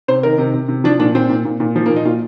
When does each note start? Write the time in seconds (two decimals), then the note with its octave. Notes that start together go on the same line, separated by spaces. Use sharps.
0.08 C3 C5
0.23 D#3 A#4
0.38 C3
0.54 C3
0.69 C3
0.84 F3 D4
0.99 A#2 D4
1.15 A#2 C4
1.29 A#2
1.45 A#2
1.60 A#2
1.76 F3
1.86 A#3
1.90 A#2
1.96 D#4
2.05 A#2 F4